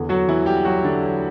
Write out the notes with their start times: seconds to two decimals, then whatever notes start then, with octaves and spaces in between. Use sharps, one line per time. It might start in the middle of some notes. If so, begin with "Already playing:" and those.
Already playing: E2 D3
0.09 F#3 F#4
0.28 E3 E4
0.46 G3 G4
0.65 F#3 F#4
0.84 D3 D4
1.02 F#3